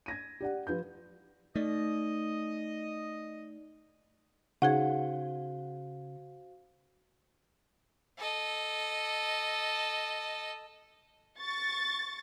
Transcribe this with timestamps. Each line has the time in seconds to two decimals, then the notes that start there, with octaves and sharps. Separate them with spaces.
0.06 G#6 A#6 D#7
0.41 G4 D5 F#5
0.67 F3 F4 B4 G6
1.56 A3 D#4 D5 D#5
4.62 C#3 D#4 F#4 G#4 C5 F5 F#5 G#6
8.18 A4 D#5
11.41 C#6 A6